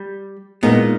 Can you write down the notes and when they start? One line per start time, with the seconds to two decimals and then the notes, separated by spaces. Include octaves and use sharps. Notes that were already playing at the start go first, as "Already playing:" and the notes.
Already playing: G3
0.63 A#2 G#3 B3 D#4